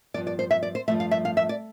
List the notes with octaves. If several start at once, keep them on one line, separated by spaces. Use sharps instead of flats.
G2 F3 B3 D5
D5
C5
E5
D5
C5
G2 F3 A3 E5
F5
E5
F5
E5
D5